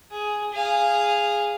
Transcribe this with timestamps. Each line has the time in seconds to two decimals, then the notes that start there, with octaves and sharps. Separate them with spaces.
0.11 G#4
0.52 G#4 F5